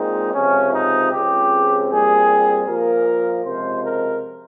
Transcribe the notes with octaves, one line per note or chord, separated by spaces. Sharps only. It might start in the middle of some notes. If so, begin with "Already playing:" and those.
Already playing: A#2 G#3 C4 D#4
C#2 C3 F3 C#4
D#4
C#2 C#3 F3 C4 G4
A#2 G3 C4 G#4
A#2 F3 A#3 A#4
C#2 C3 F3 G#3 C5
A#4